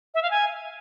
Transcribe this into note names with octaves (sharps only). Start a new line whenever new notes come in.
E5
F5
G#5